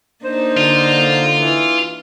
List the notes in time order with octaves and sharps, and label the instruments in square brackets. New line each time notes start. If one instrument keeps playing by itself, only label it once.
[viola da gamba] A#3 D4 D#4 [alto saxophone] C5
[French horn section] D3 [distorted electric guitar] F4
[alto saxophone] E3